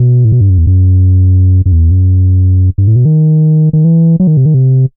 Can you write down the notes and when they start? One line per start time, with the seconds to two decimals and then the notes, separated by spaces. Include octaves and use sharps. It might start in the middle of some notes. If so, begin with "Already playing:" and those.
Already playing: B2
0.25 A2
0.32 B2
0.41 G2
0.50 F#2
0.58 E2
0.67 F#2
1.66 F#2
1.72 E2
1.91 F#2
2.78 G2
2.87 A2
2.96 B2
3.05 D#3
3.73 D#3
3.84 E3
4.20 F#3
4.27 D#3
4.37 C3
4.46 D#3
4.54 C3